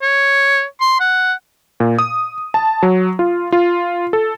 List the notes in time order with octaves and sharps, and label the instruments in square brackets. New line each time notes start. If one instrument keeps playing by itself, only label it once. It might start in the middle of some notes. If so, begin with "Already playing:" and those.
[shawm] C#5
C6
F#5
[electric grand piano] A#2
D#6
A5
F#3
F4
F4
A4